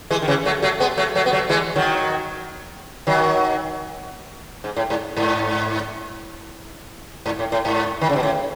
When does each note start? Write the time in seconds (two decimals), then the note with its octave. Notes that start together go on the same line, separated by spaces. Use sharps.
0.11 E3 G#3
0.22 D#3
0.28 C#3 E3
0.45 F#3 A3
0.62 F#3 A3
0.80 G#3 B3
0.97 F#3 A3
1.15 F#3 A3
1.26 B3
1.33 F#3 A3
1.49 E3 G#3
1.76 D#3 F#3
3.07 D#3 F#3
4.64 G#2
4.76 A2
4.90 G#2
5.17 G#2
7.26 G#2
7.39 A2
7.52 A2
7.65 G#2
8.01 D#3
8.10 C#3
8.16 B2
8.23 A2